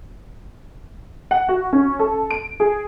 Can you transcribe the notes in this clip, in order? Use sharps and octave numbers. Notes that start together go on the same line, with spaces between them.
F#5
F#4
C#4
A4
D7
G#4